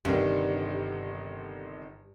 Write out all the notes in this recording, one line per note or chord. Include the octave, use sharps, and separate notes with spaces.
G1 G2 C3 D#3